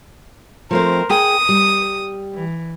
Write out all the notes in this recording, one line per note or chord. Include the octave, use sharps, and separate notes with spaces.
F3 A3 C4 A#4 C5
G#4 G5 D#6
G3
E3